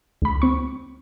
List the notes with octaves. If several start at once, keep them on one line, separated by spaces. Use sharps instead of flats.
D2 B5
C4 C#6